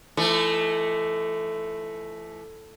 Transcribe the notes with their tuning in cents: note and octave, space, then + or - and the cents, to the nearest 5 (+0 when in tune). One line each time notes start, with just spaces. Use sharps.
E3 +45 A3 +0 D#4 +35